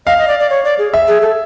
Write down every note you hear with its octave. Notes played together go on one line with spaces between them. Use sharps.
D#5 F5
D#5
D5
D5
C#5
D5
G#4
E5
G#4
A4